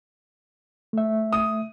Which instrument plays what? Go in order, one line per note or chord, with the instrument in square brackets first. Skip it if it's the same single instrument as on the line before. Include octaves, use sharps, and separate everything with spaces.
[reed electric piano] A3 E5
[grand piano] D#6